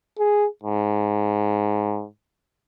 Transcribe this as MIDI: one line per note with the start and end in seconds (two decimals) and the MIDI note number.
0.18 0.46 68
0.63 2.06 44